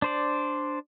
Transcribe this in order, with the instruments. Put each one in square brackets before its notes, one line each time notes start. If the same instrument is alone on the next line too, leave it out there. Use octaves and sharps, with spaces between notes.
[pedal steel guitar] D4 C5 D5